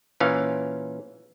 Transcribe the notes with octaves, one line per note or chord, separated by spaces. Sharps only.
A#2 E3 C#4 F5